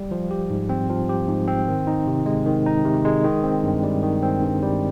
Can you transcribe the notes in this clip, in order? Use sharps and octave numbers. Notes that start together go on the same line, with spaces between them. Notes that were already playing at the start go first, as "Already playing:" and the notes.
Already playing: G3
F3
G4
G#2
C4
F3
G4
G#2
C4
D#3
D#4
C3
G#3
D#3
D#4
C3
G#3
D#3
C4
G2
G3
D#3
C4
G2
G3